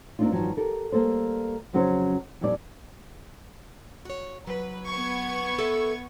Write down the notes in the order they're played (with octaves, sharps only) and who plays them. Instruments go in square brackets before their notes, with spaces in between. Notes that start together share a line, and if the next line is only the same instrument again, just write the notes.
[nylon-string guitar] A#3 C4 D4 D#4 F4
G2 C3 D#3 F3 F#3
G4 A4 A#4
G3 A#3 A4 C5
F2 C#3 F#3 C#4 G#4 C5
F2 A#2 G3 D#4 E4 D5
[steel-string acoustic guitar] F#4 C#5
[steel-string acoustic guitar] F#3 [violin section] B4
[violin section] B3 C#6 G#6
[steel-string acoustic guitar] A4 A#4 E5